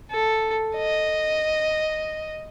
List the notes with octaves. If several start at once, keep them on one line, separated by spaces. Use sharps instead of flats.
A4
D#5